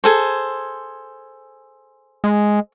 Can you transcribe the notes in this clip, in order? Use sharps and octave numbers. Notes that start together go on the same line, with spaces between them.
G#4 A4 C5
G#3